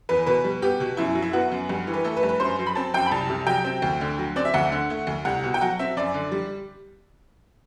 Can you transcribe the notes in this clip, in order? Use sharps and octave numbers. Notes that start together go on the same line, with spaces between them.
E2 B4
B2 B4
G3
B3 G4
B2
F#2 E4
F#3
E4
B3 F#4
F#2
G2
E3
B4
A3 A4
B4
G2
B4
F#2 C5
F#3
B5
C4 A5
F#2 G5
B5
C2 A5
C3
F#3 G5
C4
D2
D3
F#3
C4 D5
E5
D2 F#5
D3
A3
D2
C2 F#5
B2
G5
F#3 F#5
C4 E5
F#2 D5
D3
G3